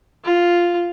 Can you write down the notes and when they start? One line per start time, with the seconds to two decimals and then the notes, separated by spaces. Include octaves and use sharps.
0.25 F4